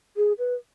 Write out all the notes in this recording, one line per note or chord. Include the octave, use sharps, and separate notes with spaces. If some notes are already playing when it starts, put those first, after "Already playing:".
G#4
B4